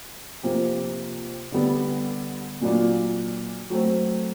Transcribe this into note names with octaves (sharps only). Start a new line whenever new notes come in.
C3 F3 A#3
D3 G3 B3
A#2 F#3 A#3 D4 F4
F#3 A3 C4